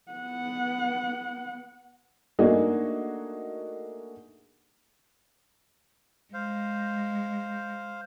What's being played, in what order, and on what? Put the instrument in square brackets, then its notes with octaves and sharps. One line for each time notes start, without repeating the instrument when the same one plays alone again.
[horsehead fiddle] B3 F#5
[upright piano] A3 A#3 D4 D#4 F#4 G#4
[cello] G#3 [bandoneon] C5 F5